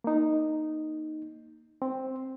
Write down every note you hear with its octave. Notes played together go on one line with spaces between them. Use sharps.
A#3 D#4
C4